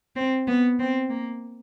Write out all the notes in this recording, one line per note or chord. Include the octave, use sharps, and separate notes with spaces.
C4
B3
C4
A#3